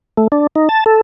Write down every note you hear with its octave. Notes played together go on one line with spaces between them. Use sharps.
A3
D4
D#4
A5
A4